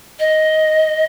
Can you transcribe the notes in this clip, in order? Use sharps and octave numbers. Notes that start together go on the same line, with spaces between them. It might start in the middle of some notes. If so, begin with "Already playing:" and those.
D#5